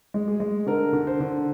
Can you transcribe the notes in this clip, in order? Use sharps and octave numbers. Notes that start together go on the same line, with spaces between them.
G#3
G#4
G#3
D3 A#4
D3
C5
D3